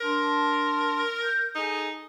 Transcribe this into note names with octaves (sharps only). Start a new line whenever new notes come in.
D4 A#4 A5 C6
G6
D#4 G#4 A4 G#5